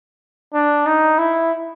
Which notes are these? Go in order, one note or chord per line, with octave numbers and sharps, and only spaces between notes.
D4
D#4
E4